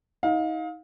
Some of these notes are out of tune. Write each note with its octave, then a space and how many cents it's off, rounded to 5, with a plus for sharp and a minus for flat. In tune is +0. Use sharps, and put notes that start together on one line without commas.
D#4 +35 F5 +25